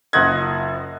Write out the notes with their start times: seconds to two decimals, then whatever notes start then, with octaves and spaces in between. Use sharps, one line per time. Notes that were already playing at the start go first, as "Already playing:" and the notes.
0.13 F#1 F4 D#5 F#5 G#6